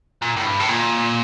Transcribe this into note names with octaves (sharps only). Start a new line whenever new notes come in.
A#2
A2
G2
A2
A#2